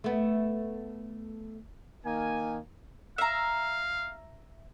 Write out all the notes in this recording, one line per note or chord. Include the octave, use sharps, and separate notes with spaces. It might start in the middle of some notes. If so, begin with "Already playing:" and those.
A3 B3
D#3 A#3 G#5
E5 F5 A#5